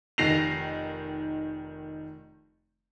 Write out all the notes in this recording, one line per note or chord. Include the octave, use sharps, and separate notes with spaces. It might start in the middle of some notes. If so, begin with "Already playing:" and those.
F1 D#3 A#6 C7 F7